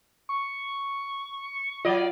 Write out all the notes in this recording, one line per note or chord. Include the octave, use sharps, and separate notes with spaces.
C#6
F#3 F4 D5 D#5